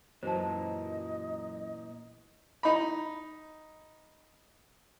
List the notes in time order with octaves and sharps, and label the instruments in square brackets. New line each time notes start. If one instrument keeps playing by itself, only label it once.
[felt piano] F#2 [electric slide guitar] A#2 E3 [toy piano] C5 A5 [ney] D#5
[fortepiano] D#4 B5